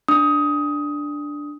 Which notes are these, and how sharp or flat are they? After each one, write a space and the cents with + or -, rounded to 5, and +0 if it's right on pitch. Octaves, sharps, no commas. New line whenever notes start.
D4 +0 D#6 +15